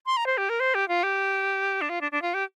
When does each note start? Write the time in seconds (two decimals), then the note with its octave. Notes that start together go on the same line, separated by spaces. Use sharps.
0.06 C6
0.17 A#5
0.26 C5
0.38 G4
0.49 A#4
0.60 C5
0.75 G4
0.88 F4
1.03 G4
1.81 D4
1.89 F4
2.01 D4
2.12 D4
2.22 F4
2.34 G4